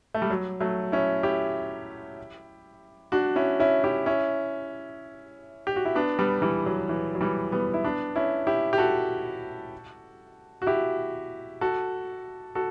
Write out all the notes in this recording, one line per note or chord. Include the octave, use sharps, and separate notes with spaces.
A3
G3
F#3
F#3 A3
C#4 E4
E4 G4
D4 F#4
C#4 E4
C#4 E4
E4 G4
C#4 E4
G4
F#4
E4
B3 D4
G3 B3
E3 G3
F#3
E3
F#3
E3 G3
G3 B3
E4
B3 D4
C#4 E4
E4 G4
G4
F#4 A4
F#4
E4 G4
F#4 A4
F#4 A4